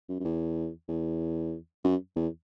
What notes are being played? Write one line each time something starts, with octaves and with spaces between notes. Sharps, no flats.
F#2
F#2
E2
E2
F#2
E2